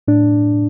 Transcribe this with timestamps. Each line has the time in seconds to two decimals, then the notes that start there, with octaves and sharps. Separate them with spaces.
0.08 A2 D4